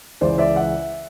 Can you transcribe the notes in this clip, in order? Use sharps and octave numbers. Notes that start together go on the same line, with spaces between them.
C#2 C#3 E3 C5 D5
D5 E5
E5 F#5